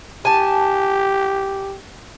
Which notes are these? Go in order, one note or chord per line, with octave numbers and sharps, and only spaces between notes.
G4 G#5 A5